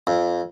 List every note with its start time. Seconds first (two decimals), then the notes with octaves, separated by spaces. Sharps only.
0.07 F2